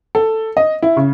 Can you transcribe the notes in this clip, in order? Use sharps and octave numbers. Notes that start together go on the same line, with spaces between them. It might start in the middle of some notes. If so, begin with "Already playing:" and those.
A4
D#5
E4
C#3